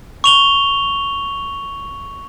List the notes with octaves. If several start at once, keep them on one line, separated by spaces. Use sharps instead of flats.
C#6 F7 G7